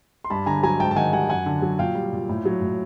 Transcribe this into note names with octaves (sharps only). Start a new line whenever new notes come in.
C6
G2 A5 B5
D3 G#5 A#5
F#3 G#5 A#5
G#2 G5 A5
A5
D#3 F#5 G#5
G3 F#5 G#5
F#2 F#5 G#5
D3
F#3
A#2 F5 G5
G3
A#2
A2
F#3
A2